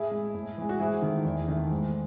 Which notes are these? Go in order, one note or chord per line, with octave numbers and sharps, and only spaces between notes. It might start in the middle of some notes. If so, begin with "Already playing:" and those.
Already playing: A2 E4 G#4
G#3
A2
E3 G#3
F#4
G#2 E4 G#4
D#3 A3
E2
D#3 A3
G#2